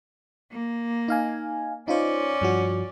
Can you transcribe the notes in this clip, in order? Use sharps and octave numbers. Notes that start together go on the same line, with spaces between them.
A#3
D#4 F5 G#5
C#4 D#4 F4 C5 D5
G2 F3 F#4